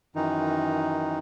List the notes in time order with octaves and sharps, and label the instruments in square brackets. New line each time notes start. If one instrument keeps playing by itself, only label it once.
[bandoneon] F#2 D#3 E3 D#4